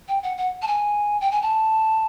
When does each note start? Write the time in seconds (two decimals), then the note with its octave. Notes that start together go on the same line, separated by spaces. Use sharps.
0.08 G5
0.23 F#5
0.38 F#5
0.62 A5
0.67 G#5
1.21 G5
1.32 G#5
1.42 A5